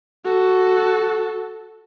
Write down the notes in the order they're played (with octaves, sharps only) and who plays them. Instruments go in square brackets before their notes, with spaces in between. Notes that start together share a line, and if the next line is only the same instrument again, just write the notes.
[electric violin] F#4 A4